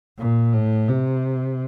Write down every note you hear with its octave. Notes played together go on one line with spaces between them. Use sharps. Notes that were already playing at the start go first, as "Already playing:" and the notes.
A#2
A2
C3